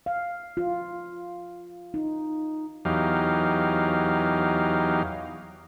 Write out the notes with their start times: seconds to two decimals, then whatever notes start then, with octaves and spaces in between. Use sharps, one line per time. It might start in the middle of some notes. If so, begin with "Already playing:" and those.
0.06 F5
0.57 F4
1.94 D#4
2.85 E2 F#3 D#4 G4 F5